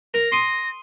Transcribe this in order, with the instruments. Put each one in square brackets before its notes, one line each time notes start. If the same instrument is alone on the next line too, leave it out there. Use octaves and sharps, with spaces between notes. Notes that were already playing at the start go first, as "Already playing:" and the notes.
[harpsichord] A#4 [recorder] A#6
[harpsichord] C6 D6 D#6